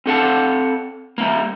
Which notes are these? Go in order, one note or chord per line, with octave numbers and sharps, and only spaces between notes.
C4 A4 F#5 A5
G3 A#3